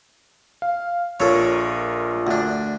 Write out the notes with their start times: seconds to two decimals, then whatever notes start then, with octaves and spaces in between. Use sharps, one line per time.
0.62 F5
1.20 A#1 F4 A4 A#4 C#5
2.27 D2 D4